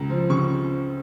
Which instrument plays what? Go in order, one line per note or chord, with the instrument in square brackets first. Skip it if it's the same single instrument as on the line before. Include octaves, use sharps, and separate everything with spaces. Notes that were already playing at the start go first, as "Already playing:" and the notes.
Already playing: [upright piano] C#2 A#5
F3
C#3 C#6